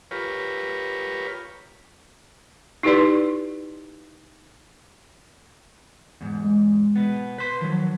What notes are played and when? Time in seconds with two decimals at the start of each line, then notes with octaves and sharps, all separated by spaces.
0.11 F4 G4 A#4 B4 C#5
2.83 D#4 E4 G4 B4 D5 C6
6.21 E2 G#2
6.44 G#3
6.96 B2 B3
7.38 B4 C6 B6
7.61 D#3 F3 F#3